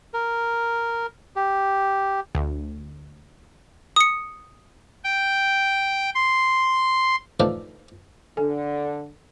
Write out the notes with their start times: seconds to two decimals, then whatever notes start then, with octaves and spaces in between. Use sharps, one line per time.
0.14 A#4
1.36 G4
2.35 D2
3.96 D#6 C#7
5.04 G5
6.15 C6
7.40 D3 E3 F3 A3 D4 D#4
8.37 D3 A4 G#5